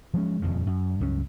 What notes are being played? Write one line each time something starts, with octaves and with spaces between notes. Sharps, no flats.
F3 F#3 G#3 C#4
D#1 G#1 F2 C#3
F#2
C#2 G2 F#3 C#4